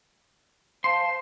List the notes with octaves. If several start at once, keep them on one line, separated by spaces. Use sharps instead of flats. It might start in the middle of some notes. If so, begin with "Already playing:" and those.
C5 F5 A5 C6